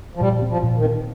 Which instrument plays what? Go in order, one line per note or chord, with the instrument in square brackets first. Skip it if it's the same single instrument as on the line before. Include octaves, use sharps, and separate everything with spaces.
[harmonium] F3
[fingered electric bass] A#2 [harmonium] G3
[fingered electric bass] C4
[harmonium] F3
[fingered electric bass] A#2
[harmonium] D#3
[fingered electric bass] C4